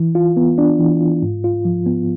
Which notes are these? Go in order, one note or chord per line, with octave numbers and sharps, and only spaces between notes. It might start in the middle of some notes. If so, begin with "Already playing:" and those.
Already playing: E3
F4
B3
D4
E3
F4
G#2
F4
F3
B3